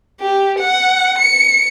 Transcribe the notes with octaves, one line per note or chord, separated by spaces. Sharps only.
G4
F#5
C#7